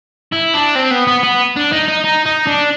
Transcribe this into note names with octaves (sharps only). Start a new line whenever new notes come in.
E4
D4
C4
B3
B3
B3
D4
D#4
D#4
D#4
D#4
D4